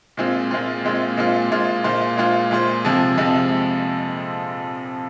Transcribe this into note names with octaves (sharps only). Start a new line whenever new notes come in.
A#2 G#3 C4 F4
A#2 G#3 C4 F4
A#2 G#3 C4 F4
A#2 G#3 C4 F4
A#2 G#3 F4 C5
A#2 G#3 F4 C5
A#2 G#3 F4 C5
A#2 G#3 F4 C5
F2 C3 F3 G#3
F2 C3 F3 G#3